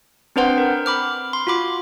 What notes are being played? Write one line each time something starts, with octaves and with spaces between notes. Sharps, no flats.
C4 D4 B4 C5 F#5 C6
A#4
B5 D6 F6
C6
F4 F#4 B5 D6